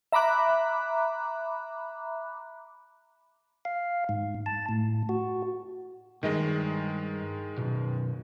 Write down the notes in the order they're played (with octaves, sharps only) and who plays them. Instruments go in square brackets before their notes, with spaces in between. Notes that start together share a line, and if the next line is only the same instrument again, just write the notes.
[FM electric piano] E5 A#5 B5 D6 F#6
[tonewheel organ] F5
G#2
A5
A2
F#4
[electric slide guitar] G2 D#5 [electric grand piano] D#3 G#3
[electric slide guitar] F#2 B2